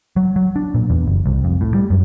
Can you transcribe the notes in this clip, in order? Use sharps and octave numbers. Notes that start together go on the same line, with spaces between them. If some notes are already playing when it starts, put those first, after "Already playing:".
F#3
F#3
D4
A#2
E2
F#1
C2
F2
A2
G3
F#2